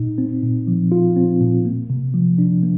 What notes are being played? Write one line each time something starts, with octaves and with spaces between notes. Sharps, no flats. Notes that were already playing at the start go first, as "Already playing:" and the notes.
Already playing: A#2 D#4
C4
A#2
F3
F4
C4
A#2
A#3
C3
F3
D4
A#3